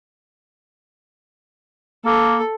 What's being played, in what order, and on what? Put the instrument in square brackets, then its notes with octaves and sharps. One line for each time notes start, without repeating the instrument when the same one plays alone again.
[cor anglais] A#3 [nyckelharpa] A4